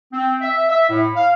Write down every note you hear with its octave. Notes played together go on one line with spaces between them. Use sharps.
C4
E5
E5
A2
F5